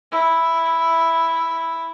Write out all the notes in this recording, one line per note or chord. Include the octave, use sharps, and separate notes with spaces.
E4